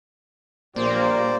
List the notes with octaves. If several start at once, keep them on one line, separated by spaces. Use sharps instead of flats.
A#1 A#2 G3 A#3 C5 D5